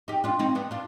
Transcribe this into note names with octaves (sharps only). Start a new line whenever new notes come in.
D#4 G4
D4 F4
C4 D#4
B3 D4
D4 F4